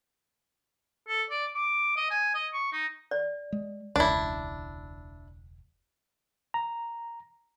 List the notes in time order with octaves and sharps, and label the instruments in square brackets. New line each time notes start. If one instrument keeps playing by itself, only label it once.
[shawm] A4
D5
D6
D#5
G#5
D#5
C#6
D#4
[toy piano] D5
[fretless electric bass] G#3
[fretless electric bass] E1 C#2 [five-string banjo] D4 E4
[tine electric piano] A#5